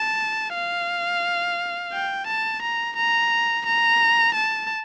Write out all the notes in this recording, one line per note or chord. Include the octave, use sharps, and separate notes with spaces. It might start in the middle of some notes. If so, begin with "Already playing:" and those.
Already playing: A5
F5
G5
A5
A#5
A#5
A#5
A5